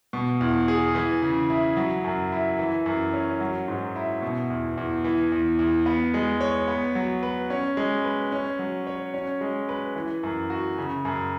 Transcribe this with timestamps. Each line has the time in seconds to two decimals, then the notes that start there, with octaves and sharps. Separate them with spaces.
0.13 B2
0.41 E2
0.68 G#4
0.95 E3
1.22 C#3
1.50 E4
1.77 F#3
2.04 F#2
2.32 E4
2.59 E3
2.86 F#2
3.13 C#4
3.41 F#3
3.68 G#2
3.96 E4
4.22 B2
4.50 E2
4.77 E2
5.04 E3
5.32 E2
5.59 E2
5.86 B3
6.14 G#3
6.41 C#5
6.68 B3
6.95 F#3
7.23 B4
7.50 C#4
7.77 G#3
8.04 B4
8.32 C#4
8.59 F#3
8.87 C#5
9.14 C#4
9.41 G#3
9.69 B4
9.96 E3
10.23 F#2
10.50 F#4
10.78 C#3
11.05 F#2